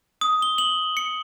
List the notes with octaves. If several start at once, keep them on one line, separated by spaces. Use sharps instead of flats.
D#6
G7
F#7
C#7